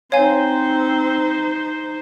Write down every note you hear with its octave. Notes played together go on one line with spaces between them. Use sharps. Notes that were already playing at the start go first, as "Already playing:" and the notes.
C4 D#4 C5 C#5 F5 G#5